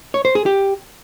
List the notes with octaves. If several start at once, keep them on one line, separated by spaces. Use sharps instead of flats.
C#5
C5
G#4
G4